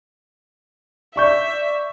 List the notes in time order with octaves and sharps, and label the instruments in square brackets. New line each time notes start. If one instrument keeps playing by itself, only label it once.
[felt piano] D5 C#6 G6 [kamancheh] E5